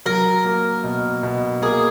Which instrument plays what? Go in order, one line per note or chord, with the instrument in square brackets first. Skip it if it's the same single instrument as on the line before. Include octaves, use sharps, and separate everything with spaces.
[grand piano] F#3 [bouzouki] A#4
[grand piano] A#3
B2
B2
[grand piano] A#3 [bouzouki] G#4